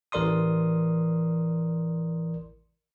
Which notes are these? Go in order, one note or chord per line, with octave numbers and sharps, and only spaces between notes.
A1 E3 A#4 D5 C6 D#6